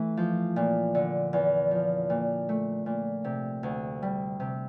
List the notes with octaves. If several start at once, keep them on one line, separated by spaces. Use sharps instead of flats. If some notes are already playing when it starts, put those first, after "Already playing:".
Already playing: E3 A3
F3
A#2
D3
E2
F3
A#2
A3
A#2
C3
D2
G3
C3